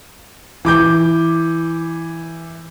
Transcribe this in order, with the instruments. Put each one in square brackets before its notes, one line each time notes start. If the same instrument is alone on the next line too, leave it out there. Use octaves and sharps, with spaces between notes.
[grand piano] E3 D6 G6